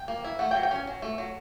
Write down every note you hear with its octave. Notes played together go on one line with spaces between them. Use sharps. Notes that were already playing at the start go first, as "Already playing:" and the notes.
Already playing: G5
A#3
E4
A3 F#5
G5
F#3
G5
C#4 G#5
F#3
A3
F#3